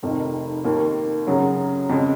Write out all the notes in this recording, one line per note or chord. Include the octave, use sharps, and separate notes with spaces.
F1 F2 D#3
D#2 D#3 A#3
F#2 C#3 F#3
F2 C#3 G#3